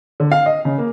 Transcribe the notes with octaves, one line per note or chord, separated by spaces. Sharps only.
D3
F5
D#5
C#3
A#3